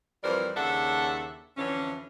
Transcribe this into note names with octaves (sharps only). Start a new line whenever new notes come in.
F2 E3 G3 A#4 C5 D5
D#2 C#3 D4 A4 E5 F#5
F2 D3 E3 C#4